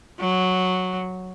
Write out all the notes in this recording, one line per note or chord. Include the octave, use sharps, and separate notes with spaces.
F#3